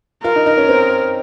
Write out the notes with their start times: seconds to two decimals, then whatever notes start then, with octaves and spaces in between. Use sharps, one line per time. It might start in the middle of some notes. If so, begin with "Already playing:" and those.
0.24 F4 A#4
0.36 D#4
0.46 D#4
0.58 C#4
0.69 C4